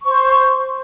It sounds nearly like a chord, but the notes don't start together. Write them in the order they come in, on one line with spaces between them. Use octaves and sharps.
C#6 C5 C6